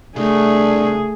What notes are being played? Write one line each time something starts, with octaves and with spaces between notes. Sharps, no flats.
C2 A3 D4 G#4